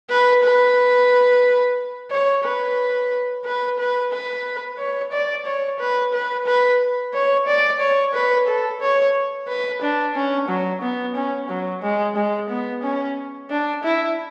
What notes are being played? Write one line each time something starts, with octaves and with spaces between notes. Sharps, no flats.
B4
B4
C#5
B4
B4
B4
B4
C#5
D5
C#5
B4
B4
B4
C#5
D5
C#5
B4
A4
C#5
B4
D4
C#4
F#3
B3
C#4
F#3
G#3
G#3
B3
C#4
D4
E4